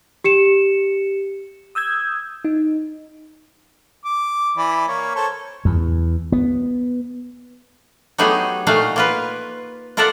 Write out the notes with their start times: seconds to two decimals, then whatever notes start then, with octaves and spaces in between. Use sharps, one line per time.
0.24 G4 C#7 E7
1.75 D#6 E6 G6 G#6
2.45 D#4
4.05 D6
4.57 E3 D5 B5
4.88 A#3 C#5
5.15 A4 C5 C#5
5.65 E2
6.32 B3
8.18 F#3 A3 B3 D#4 G4 G#4
8.67 A#2 A3 D#4 F#4 F5
8.96 A#3 F4 B4
9.97 F4 A4 A#4 D5 E5 F#5